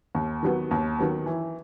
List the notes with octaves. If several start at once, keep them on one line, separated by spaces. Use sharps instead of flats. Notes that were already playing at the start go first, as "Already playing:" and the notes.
D#2
D#3 F#3 B3
D#2
D#3 F#3 B3
E3